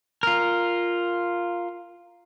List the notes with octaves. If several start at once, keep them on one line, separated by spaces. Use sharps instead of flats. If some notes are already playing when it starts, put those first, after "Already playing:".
F4 A#4